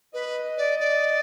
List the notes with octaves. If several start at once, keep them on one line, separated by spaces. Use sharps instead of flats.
B4 D#5
D5
D5